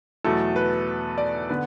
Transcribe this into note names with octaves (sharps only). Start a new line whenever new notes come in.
E2 B2 F#3 A3 E4 A4
B4
D5
D3 B3 B4